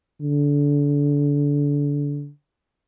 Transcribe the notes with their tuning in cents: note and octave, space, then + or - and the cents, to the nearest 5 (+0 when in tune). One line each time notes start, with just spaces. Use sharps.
D3 -25